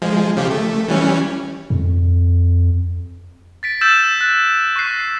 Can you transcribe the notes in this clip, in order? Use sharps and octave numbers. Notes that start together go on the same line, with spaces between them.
F3 G#3
C#3 F3 G4
A3
E3 G3 C#4
F2
A6 B6 D7
E6 F6 G6 A6 E7
F#6 A6
C#6 F#6 A#6 C7